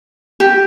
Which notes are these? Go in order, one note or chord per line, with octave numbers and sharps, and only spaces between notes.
G4